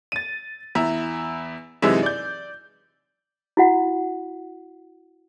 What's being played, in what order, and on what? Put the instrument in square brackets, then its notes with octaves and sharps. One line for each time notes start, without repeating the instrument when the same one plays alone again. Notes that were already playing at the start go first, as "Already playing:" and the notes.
[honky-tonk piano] A6 D#7
E2 E4 A#5
F#2 C3 E3 G#3 D#4 E4
D5 G6
[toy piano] E4 F#4 F#5